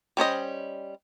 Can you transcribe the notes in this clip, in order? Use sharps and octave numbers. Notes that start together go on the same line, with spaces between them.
G3 C#4 C5 D#5